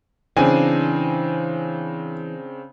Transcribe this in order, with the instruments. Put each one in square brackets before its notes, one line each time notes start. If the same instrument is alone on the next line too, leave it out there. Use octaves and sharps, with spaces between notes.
[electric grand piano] C#3 C4 D4 [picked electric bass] E3 [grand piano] G#5